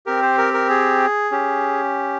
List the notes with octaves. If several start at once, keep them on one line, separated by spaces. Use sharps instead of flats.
C4 G4 A#4
C5
A#4
A#4
G#4
C#4 G4